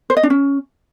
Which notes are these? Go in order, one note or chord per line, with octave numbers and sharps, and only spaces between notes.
C5
D#5
D4
C#4